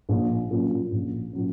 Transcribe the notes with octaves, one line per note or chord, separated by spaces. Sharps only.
A#1
A#2 F#3 C#4
A#1
A#2 F#3 C#4